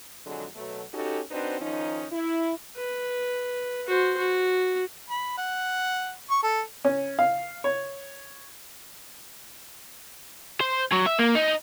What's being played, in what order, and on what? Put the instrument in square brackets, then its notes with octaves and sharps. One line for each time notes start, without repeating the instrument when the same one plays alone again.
[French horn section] F2 D3 F#3 G#3
B2 F#3 A3
C#4 D#4 F#4 G4 A4
C4 D4 D#4 F#4 B4 C5
D#3 F3 C#4 D#4
E4
[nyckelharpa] B4
F#4 C5
F#4
[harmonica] B5
F#5
C#6
A4
[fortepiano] C#4
F5
C#5
[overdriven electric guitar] C5
F#3
E5
A#3
D#4